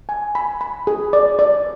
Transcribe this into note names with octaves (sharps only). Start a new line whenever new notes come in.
G#5
B5
B5
G#4
D5
D5